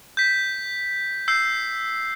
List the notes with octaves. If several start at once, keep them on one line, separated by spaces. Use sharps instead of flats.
G6 B6
E6 G6 C7